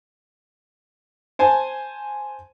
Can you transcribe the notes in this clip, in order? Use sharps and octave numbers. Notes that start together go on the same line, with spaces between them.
C5 G#5 A5